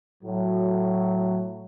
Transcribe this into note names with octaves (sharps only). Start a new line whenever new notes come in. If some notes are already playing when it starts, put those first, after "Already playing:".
A2 F#3